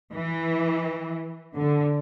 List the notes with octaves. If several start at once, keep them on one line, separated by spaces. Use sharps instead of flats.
E3
D3